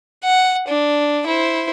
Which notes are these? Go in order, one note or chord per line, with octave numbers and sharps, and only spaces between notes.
F#5
D4
E4 C5